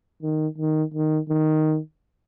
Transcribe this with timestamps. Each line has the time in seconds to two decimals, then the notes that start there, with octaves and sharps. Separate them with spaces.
0.23 D#3
0.58 D#3
0.94 D#3
1.29 D#3